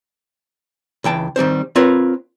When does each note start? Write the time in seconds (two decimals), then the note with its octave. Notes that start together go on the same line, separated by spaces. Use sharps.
1.04 C#2 E3 G5 A5
1.36 D#3 G3 C4 C5
1.76 C4 F4 A#4 B4 C#5